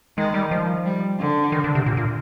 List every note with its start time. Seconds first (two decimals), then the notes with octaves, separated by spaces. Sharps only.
0.17 D#3 G#3
0.34 G3
0.51 F3
0.85 G3
1.19 D3
1.52 D#3
1.64 D3
1.75 C3
1.86 A#2
1.97 A#2